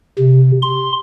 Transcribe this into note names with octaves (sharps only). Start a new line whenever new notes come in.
C3
C6